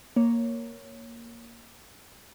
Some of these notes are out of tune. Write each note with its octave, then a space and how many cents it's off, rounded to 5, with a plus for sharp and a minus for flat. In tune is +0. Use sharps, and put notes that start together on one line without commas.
A#3 +0 C#5 +0